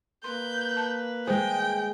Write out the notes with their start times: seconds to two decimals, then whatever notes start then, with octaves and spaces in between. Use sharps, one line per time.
0.24 A#3 B4 C6 G6
0.77 A5
1.27 G#3 G#4 C5 G5